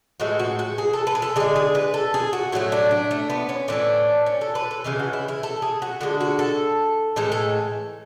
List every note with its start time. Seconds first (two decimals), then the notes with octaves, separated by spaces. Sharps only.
0.20 A2 E3 G#3 F#4
0.39 F#4
0.59 F#4
0.78 G#4
0.93 A4
1.07 B4
1.15 G#4
1.22 A4
1.36 D3 G#3 G#4
1.56 G#4
1.75 B4
1.94 A4
2.14 G#4
2.33 F#4
2.52 A2 F#3 A3 E4
2.72 D4
2.91 D4
3.11 A3
3.30 B3
3.49 C#4
3.68 A2 E3 A3 D4
4.26 C#4
4.41 A4
4.55 B4
4.71 A4
4.84 C#3 E3 G#3 G#4
4.99 F#4
5.13 E4
5.28 E4
5.43 A4
5.62 G#4
5.82 F#4
6.01 D3 G#3 F#4
6.20 F#4
6.39 A4
7.16 A2 E3 G#3 A4
7.32 A4